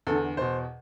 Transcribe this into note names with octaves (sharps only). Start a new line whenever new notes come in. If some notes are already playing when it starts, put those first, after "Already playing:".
E2 D3 A4
E2 B2 C5